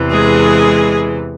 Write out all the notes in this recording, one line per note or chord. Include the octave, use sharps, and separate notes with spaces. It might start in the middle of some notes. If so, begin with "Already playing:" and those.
Already playing: E2 C3 E3
G#3 G#4